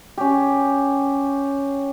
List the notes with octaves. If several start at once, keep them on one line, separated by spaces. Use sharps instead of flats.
C#4 G4